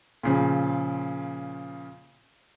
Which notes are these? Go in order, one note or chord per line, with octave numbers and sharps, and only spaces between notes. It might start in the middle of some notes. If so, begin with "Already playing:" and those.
A#2 C#3 F3